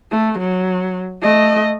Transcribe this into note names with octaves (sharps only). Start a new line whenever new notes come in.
A3
F#3
A3 D#5